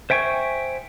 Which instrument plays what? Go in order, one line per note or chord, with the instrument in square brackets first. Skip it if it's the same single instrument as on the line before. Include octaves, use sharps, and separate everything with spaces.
[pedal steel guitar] C5 E5 G5 G#5 C#6